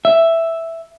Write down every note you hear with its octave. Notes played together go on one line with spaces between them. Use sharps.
E5